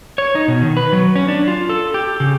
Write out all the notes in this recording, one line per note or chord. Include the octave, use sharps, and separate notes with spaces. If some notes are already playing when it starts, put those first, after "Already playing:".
C#5
D#4
B2
D#3
B4
F#3
C#4
D4
F4
A4
G4
C#3